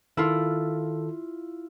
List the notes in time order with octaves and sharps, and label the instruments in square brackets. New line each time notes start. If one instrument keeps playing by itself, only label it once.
[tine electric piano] D#3 A4 [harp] E4 F4